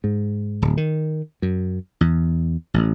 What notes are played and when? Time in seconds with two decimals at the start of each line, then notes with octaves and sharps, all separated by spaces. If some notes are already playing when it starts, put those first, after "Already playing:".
0.04 G#2
0.62 D1
0.77 D#3
1.42 F#2
2.01 E2
2.74 A1